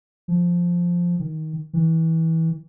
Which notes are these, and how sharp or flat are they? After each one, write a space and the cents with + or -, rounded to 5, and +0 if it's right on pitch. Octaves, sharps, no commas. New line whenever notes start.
F3 +0
D#3 +15
E3 -25